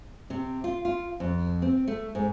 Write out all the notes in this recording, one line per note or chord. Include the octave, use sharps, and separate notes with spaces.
C3
F4
F4
F2
C4
A3
G#2